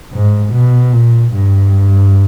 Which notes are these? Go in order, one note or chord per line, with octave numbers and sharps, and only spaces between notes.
G#2
B2
A#2
G2